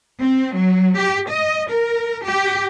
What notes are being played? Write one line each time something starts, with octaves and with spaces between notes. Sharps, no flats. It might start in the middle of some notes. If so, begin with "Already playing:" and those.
C4
F#3
G4
D#5
A#4
G4